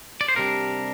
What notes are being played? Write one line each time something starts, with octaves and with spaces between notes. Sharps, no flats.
D5
C5
C3 G3 D4 A#4